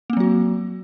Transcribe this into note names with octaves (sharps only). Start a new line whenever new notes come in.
F#3 A#3 C4 F#4